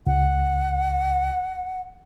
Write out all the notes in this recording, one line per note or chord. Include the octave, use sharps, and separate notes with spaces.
C#2 F#5